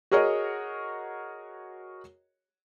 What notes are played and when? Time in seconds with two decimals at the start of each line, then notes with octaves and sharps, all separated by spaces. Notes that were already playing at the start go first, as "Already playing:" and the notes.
0.11 F#4 G#4 A#4 C#5 D#5